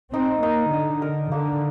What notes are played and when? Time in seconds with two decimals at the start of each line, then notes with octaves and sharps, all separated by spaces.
0.13 C4 D#4
0.43 A#3 D#4
0.73 D3 D#5
1.02 A#4
1.32 D3 A#3